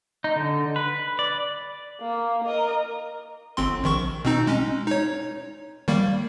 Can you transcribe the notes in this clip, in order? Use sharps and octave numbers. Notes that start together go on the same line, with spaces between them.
D#4
D3
B4
D5
A#3
A#4 D#5
G1 C4 C6
A#1 D#3 C#6
B2 C4 D#4
G#3 C#4
D#4 C#5
D#3 G3 A#3